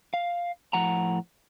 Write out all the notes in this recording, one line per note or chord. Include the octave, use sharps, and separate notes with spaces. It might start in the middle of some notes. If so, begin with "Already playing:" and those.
F5
A2 F3 F#5 A#5